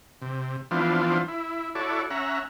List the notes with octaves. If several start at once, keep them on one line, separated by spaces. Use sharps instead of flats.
C3
E3 F3 B3 C4 D4 F4
E4
E4 F#4 A4 C#5 D5
C#4 E5 F#5 A#5